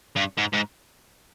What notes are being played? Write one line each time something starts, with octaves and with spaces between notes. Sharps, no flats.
G2
G#2
G#2